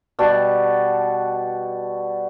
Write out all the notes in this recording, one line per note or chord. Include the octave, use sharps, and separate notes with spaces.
B2 G3 F#4 A5